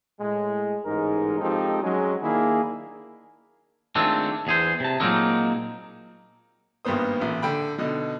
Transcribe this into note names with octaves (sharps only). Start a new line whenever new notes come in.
A2 G#3
A1 G#2 G#3 D#4 A#4
F3 G#3 C4 D#4 G4 A4
F#3 G#3 C#4
D#3 A#3 D4 E4 G#4
D#3 G#3 A3 C4 D4 F4
E2 G#4 C5
C3 A5
A#2 F#3 G#3 A#3 C4 D#4
G#1 G2 A#3 B3 C5 D#6
A1 A#2
D3 G5 B5
B2 D3 D#4